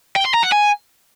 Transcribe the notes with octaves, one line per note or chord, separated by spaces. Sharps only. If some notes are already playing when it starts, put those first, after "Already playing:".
G5
C6
A#5
F#5
G#5